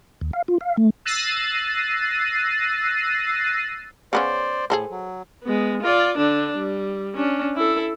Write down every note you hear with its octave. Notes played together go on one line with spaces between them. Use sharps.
D#2
F5
F4
F5
A3
E6 F#6 A6 A#6 C7 D#7
C#3 B3 C#4 C5 D5
A2 G#4 A4 C5
F#3
G#3 B3
F4 D5
D3 D4
G3
C#4 D4
E4 A4